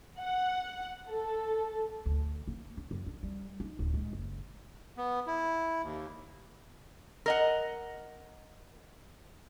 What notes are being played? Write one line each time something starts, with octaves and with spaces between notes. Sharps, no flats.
F#5
A4
D2
A#3
D4
F#2
D4
G3
D#4
D1
G#3
F#1
B3
E4
D#2
A#4 D#5 F#5